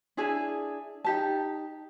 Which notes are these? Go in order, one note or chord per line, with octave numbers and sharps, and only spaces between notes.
D4 E4 G#4 G#5
D#4 G4 A5